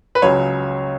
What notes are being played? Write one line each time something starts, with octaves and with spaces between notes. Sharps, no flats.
B4
C#2 C#3 F#3 C#5